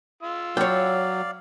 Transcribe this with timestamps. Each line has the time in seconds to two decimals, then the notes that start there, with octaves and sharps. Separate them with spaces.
0.23 F4 E6
0.57 F#3 C#5 D5 F5 G5